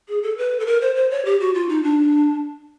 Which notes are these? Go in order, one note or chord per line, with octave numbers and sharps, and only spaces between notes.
G#4
A4
B4
A4
A#4
C5
C5
C#5
G4
F#4
F4
D#4
D4